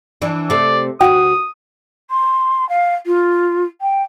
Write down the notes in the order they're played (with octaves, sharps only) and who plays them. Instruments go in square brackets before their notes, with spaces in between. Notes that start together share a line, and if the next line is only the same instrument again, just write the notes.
[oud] E3 D4
[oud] C3 A3 [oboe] D5
[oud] D2 F#4 [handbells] F#5 G5 [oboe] D#6
[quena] C6
F5
F4
G5